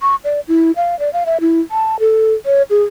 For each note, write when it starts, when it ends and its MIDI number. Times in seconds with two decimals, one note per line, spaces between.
0.02 0.16 85
0.24 0.40 74
0.48 0.72 64
0.76 0.98 77
0.99 1.12 74
1.13 1.24 77
1.26 1.40 76
1.41 1.60 64
1.71 1.99 81
2.00 2.34 69
2.46 2.63 73
2.70 2.83 68